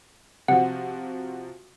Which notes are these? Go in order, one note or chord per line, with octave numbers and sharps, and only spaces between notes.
C3 F3 F#4 F#5